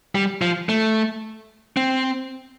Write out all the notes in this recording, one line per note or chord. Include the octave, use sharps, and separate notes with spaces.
G3
F3
A3
C4